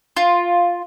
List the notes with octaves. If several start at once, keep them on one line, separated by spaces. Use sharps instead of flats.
F4